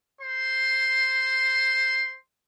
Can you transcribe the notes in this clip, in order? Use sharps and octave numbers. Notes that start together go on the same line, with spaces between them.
C5 C6